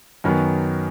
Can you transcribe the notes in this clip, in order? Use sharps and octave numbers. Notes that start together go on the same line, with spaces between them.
F#2 D#3 F#3 B3